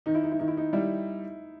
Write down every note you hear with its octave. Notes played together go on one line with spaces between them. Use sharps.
D#3 D#4
E4
D#4
E4
D#3 D#4
E4
D#4
G3 E4